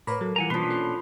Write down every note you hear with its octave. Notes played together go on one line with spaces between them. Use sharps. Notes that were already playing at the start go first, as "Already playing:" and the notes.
A2 A#3 B4 C#5 A#5 B5
F#3 A4
E3 G3 F4 A#4 F#5 G#5 A#5
B2 F3 A#3 C#4 D4 B4 C6
A4